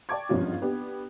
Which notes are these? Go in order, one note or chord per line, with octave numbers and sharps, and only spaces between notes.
D5 G5 A5 C#6 D6 G#6
G#1 E2 G2 F3 C#4 F4
B3 D4 G4